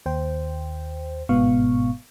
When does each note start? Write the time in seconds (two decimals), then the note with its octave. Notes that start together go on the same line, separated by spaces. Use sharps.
0.06 D#2 C5 G5
1.29 G1 G#2 B2 B3 F5 C#6